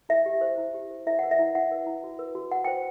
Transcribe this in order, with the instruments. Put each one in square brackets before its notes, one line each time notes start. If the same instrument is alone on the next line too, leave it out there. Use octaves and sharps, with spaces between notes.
[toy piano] E4 E5
G4
C5
E4
G4
C5
E4 E5
B4 F#5
E5
E4
E4 F#5
B4
E4
F#4
B4
F#4
F#4 F#5
C5 G5